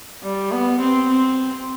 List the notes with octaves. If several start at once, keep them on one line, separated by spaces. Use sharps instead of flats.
G3
B3
C4
C4